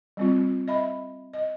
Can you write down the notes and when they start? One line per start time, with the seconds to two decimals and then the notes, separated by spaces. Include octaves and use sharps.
0.17 G3 C4 F4
0.68 D#5 E5 B5
1.34 D#5